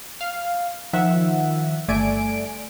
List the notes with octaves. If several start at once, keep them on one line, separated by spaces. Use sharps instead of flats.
F5
D#3 F3 E5 F#5
G1 A3 D5 G#5 D7